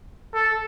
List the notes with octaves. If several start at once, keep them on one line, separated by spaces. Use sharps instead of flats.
A4